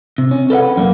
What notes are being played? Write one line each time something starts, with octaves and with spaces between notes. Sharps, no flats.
C3
C#4
A4 B4 E5 F#5
B4
F#2 A#3